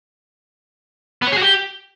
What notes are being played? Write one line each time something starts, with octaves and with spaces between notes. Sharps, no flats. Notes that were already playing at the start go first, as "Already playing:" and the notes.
B3
C#5
G#4
F#4
G4